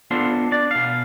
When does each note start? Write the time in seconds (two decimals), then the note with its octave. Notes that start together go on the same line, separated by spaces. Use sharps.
0.11 B3 D4 F4 A4 C5
0.52 D4 D5
0.71 B2 F5